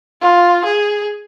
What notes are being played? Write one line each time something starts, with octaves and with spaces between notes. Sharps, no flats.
F4
G#4